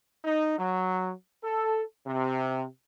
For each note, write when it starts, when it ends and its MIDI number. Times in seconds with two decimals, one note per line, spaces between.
0.25 0.59 63
0.59 1.11 54
1.43 1.82 69
2.06 2.64 48